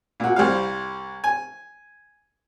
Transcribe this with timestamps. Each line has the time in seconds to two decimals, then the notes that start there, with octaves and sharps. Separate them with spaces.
0.20 A#2 F#4
0.36 C2 G3 F5
1.24 G#5